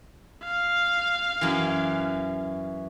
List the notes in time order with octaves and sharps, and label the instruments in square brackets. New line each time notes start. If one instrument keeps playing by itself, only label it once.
[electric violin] F5
[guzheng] F#2 E3